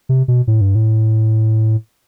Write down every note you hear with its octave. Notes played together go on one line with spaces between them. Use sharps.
C3
B2
A2
G2
A2